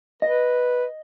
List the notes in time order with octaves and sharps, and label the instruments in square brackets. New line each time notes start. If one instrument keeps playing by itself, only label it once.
[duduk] B4 [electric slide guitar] D#5